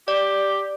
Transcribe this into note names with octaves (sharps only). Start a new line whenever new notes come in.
G4 D5